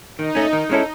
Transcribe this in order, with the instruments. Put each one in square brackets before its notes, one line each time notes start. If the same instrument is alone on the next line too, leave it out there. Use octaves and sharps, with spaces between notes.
[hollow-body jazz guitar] D#3 [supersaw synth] D#4
[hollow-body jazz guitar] A3 C#4
D#3
G#3 C#4 E4 A4